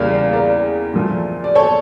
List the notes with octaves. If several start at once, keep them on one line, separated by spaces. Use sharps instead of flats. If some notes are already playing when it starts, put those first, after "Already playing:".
Already playing: E2 C#3 G3 A#3 D5 F5
A#4 D5
A#2 F3 A3
D5
A4 C#5